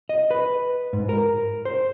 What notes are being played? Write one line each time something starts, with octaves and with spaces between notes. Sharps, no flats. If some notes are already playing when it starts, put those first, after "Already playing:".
D#5
B4
G#2
A#4
C5